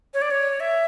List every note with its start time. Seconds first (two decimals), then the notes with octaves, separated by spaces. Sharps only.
0.14 C#5
0.22 D5
0.31 C#5
0.60 E5